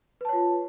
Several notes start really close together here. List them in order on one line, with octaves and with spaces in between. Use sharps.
B4 A5 C#5 F4